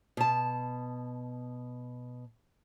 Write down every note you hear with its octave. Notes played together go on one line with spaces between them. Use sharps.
B2 A5